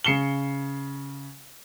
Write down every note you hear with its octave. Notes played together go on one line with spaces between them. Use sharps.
C#3 C7 C#7 E7 G7